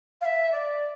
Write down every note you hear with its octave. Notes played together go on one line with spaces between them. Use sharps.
F5
E5
D5